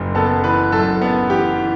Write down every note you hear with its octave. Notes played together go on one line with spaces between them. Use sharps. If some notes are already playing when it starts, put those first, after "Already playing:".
Already playing: F#1 F#2
B3 A4 A5
E3 B4 B5
F#2 A4 A5
B3
E3 G4 G5
E3